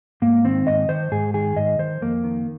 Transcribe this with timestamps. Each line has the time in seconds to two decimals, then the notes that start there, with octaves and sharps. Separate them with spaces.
0.22 G#2 A#3
0.44 D#3 C4
0.67 G#2 D#5
0.89 D#3 C5
1.12 G#2 G#4
1.34 D#3 G#4
1.57 G#2 D#5
1.79 D#3 C5
2.01 F2 A#3
2.24 D#3